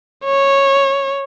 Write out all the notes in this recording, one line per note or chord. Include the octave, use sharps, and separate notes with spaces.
C#5